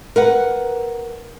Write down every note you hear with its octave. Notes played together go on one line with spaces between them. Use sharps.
A#4 B4 F#5